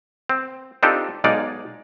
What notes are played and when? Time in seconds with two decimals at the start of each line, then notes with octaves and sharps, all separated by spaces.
0.29 C4
0.83 C4 D4 D#4 F4 G4 A4
1.24 B1 G#3 D#4 D5 F5